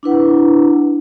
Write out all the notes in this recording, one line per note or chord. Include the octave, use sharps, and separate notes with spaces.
D4 E4 B4 F#5